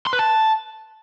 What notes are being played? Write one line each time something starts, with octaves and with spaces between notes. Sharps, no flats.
C6
B4
A5